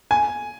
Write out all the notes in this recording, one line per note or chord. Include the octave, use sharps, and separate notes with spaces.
G#5